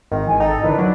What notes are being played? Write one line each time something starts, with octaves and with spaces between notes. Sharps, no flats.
G#1 D#3
E3 G#5
D#4 A4 G5
A#2 D3 E3 D4 D#4 B4
F#3